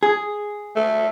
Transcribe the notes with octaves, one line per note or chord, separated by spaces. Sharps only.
G#4
A3